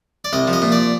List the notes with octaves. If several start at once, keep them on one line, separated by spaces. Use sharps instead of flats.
D5
C2 D#5
F3
D#5
A#2
D5